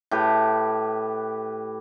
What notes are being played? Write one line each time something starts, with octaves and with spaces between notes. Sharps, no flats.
A2 G4 B4